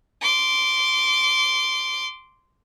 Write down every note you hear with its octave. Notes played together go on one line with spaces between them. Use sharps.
C6 D6